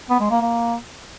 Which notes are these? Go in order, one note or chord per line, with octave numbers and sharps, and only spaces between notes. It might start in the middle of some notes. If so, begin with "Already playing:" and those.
B3
G#3
A#3
A#3